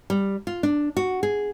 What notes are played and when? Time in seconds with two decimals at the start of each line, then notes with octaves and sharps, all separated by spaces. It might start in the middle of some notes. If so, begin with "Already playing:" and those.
0.10 G3
0.47 F4
0.63 D4
0.97 F#4
1.23 G#4